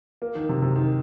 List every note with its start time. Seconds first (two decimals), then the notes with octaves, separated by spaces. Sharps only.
0.22 A#3
0.35 D#3
0.49 C3
0.62 C3
0.76 D#3